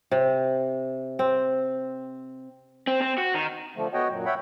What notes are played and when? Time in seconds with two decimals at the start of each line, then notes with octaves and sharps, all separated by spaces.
0.11 C3
1.19 C4
2.87 C4
3.02 C4
3.18 F#4
3.34 D#3
3.76 D3 F3 A3
3.94 B3 F#4 C#5 D#5 F#5 G5
4.10 F#2 A#2 F#3
4.25 C#5 E5 F#5 G5 B5